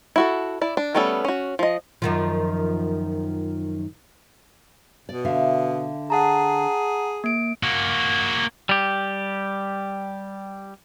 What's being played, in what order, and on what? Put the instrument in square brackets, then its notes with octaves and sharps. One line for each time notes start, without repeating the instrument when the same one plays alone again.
[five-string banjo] E4 F#4 A4
E4 D5
D4
G3 A3 B3 C#4 A4
C#4 F#4
F3 D#5
[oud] F#2 D#3 F3
[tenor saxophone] B2 [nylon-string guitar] D5
[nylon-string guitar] D3 E5 F5
[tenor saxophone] G#4 [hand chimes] F#5 A5 A#5
[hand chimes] A#3 D7
[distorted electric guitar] A#3 F#4
[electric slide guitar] G3 G4